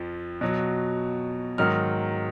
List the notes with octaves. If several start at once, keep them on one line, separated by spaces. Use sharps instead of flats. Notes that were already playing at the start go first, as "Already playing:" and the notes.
Already playing: F2 F3
B2 F#3
G#2 D#3 F#3 F6